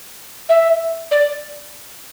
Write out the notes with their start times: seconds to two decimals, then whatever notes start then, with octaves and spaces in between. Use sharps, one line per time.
0.49 E5
1.11 D5